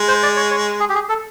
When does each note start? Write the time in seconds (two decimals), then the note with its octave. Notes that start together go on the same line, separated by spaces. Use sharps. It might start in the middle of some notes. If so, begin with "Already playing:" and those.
Already playing: G#3
0.08 C5
0.23 D5
0.37 C#5
0.51 C#5
0.80 G#4
0.89 G4
0.94 G#4
1.09 A4